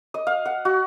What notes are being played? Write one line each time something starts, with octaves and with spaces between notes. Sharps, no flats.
D#5
F5
F#5
F#4